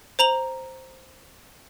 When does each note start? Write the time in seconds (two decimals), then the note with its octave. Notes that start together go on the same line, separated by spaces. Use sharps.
0.19 C5 A#5 F7 F#7